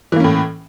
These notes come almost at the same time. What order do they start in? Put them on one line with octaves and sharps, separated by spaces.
E3 A#3 C#4 A2